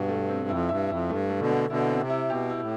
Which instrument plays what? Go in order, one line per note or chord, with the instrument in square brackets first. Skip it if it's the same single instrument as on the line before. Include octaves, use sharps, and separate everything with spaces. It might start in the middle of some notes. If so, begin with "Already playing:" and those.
Already playing: [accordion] G2 [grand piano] B2
[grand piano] A3
C4
[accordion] F2 [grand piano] E4
[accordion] G2 [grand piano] E5
[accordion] F2 [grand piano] E4
[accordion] G2 [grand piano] A3
[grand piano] A3
[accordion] B2 D3
[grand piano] A3
[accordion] B2 D3 [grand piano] E4
[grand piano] C4
[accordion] C3
[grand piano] E4
[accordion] B2 [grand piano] G4
[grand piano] E4
[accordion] A2